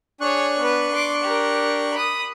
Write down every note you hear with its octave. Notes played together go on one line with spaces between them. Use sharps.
D4 G#4 C#5 C#6 F#6
B3 B4
C6 D6
G4 A#4
B5 D#6